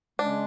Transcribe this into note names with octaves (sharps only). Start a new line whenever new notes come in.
C#3 G#3 C#4 D4